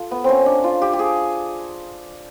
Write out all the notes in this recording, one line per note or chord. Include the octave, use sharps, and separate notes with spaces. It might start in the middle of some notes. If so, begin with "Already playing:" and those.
Already playing: F4 A4
B3
C4 C#4
D4
F4
G4
G4
G#4